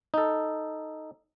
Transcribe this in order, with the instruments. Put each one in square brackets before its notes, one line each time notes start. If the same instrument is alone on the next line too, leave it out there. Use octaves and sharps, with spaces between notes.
[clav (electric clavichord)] D#4 A4